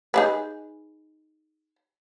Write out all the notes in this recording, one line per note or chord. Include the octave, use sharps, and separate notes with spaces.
D#4 G#4 B4